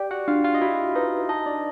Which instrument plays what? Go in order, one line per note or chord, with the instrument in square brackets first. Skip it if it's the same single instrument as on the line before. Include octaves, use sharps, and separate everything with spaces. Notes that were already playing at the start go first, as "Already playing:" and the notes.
Already playing: [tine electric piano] G4 G5 [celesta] D5
[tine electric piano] F#4 F#5
[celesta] D4 [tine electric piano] F4 F5
[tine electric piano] F4 F5
D#5
[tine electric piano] E4 E5 [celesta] F#4
[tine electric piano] D#4 D#5 [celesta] B4
[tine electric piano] D#4 D#5 [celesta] A5
[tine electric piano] D4 D5